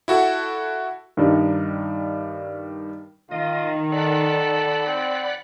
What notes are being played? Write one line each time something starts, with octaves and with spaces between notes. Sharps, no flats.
E4 F#4 A4 F#5
G2 D#3 G3 D4 D#4
D#3 F4 D#5
A4 D5 F#5 B5
C4